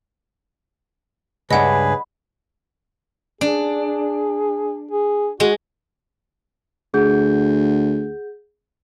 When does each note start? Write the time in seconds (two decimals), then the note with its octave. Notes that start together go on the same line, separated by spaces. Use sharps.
1.51 C#2 G2 D4 G#4 B4 D#5 F#5 B5
3.41 D4 G#4
4.91 G#4
5.40 G#3 F#4
6.94 D2 G#4 F#5 G6